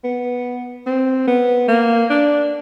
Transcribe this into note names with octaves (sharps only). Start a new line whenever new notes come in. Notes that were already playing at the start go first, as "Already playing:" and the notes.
B3
C4
B3
A#3
D4